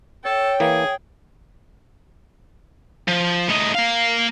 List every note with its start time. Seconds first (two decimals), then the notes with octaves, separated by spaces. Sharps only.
0.25 A4 C#5 G5
0.60 E3 A#3 G#4
3.08 F3
3.49 A2 D#4
3.75 A#3 F5